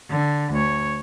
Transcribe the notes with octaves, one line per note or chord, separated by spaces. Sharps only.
D3
D2 C#5